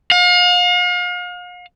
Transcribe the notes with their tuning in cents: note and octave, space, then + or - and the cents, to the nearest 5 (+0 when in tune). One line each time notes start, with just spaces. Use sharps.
F5 +40